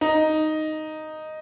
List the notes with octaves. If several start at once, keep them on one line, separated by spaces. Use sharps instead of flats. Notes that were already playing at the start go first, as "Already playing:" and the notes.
D#4